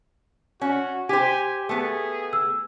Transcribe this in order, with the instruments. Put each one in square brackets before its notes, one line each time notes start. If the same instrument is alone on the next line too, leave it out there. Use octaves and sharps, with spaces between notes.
[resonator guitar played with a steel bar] C#4 [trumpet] F#4
[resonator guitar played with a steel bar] G4 C5 [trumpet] G#5
[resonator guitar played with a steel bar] A3 B3 [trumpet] G#4
[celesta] E6